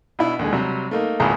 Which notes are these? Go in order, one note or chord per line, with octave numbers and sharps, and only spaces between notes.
B2 D4 E4
D#2 D3 G#3
C3 F#3 G3
A3 A#3 D#4
G#1 C#2 A#3 E4 G#4 A#5